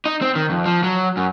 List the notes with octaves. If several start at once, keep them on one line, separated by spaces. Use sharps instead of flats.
D#4
C4
D#3
F2
F3
F#3
F#2